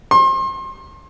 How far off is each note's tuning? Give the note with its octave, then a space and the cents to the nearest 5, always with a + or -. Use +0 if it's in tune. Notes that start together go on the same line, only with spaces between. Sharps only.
C6 +35